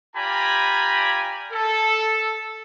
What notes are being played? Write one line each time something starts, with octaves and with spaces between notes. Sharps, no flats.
F4 G4 D5 G#5 A#5 B5
A4